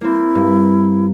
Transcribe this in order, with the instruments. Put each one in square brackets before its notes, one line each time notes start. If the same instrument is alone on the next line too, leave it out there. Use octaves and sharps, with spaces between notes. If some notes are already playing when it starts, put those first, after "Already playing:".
[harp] A#3 C4 [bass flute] E4
[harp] G2